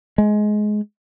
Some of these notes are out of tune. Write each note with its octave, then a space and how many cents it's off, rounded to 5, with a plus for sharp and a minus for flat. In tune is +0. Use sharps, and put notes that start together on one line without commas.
G#3 +20